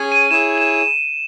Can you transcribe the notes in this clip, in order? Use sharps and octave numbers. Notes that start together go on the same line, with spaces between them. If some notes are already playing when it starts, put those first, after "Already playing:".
Already playing: C#4 G#4 C#5 G#5
D#7
E4 G#4 C#5 E7
E7